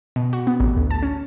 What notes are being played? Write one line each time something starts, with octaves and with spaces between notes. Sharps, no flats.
B2
F#4
B3
A1
D2
A5
C#4